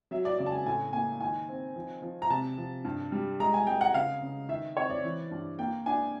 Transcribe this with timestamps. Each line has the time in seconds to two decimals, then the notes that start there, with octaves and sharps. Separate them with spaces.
0.11 F#3 E5
0.25 D5
0.39 C#3 D5
0.46 A5
0.52 G#5
0.66 A2 G#5
0.93 A#3 G#5
1.20 D#3 G#5
1.49 C4
1.76 F3
2.02 F3
2.22 A#5
2.30 C3 A5
2.58 F3
2.85 G2
3.12 G3
3.40 G#3 A#5
3.54 G#5
3.67 G#3 G5
3.81 F#5
3.94 C#3 F5
4.22 C#3
4.48 D#3 E5
4.76 C4 C#5
4.90 D5
5.04 E3
5.31 G2
5.59 A#3 G5
5.86 D4 G#5